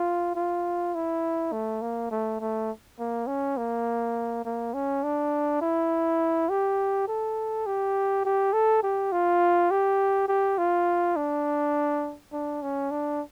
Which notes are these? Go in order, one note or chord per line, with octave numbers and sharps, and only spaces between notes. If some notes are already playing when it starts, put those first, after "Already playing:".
Already playing: F4
F4
E4
A3
A#3
A3
A3
A#3
C#4
A#3
A#3
C#4
D4
E4
G4
A4
G4
G4
A4
G4
F4
G4
G4
F4
D4
D4
C#4
D4